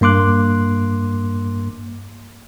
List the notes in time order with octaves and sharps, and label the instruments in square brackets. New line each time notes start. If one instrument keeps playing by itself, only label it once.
[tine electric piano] G2 A#3 C6 D6 F#6